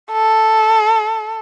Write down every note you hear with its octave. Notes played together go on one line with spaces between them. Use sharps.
A4